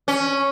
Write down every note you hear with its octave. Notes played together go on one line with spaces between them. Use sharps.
C#4